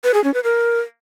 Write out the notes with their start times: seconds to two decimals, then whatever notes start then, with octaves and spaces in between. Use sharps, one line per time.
0.04 B4
0.14 G#4
0.24 C#4
0.34 B4
0.44 A#4